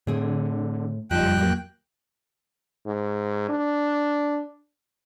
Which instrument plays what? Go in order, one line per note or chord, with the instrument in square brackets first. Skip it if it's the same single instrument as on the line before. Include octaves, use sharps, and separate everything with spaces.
[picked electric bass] A2 [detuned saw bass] D3 [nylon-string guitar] C4 G#4 C#5
[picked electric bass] F#1 F2 [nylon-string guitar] F3 D#4 [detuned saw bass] G3 [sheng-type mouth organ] G5 F#6
[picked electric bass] F2 [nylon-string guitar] A2 F#3 A#3
[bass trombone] G#2
D4